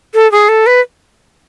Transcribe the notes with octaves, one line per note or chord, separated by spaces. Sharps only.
A4
G#4
A4
B4